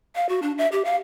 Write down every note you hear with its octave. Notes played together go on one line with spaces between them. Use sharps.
F5
F#4
D4
E5
G4
F5